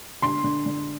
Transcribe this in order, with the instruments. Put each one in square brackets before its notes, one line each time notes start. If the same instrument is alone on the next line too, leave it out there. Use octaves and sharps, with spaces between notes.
[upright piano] D3 C6
D3
D3